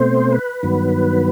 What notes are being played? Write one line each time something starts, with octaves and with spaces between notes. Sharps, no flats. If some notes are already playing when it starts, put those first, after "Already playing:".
Already playing: B2 A3 C4 C5
B4
G2 D#3 F#3 B3